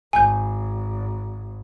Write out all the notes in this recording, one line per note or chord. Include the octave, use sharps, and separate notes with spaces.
G#1 G#5 G6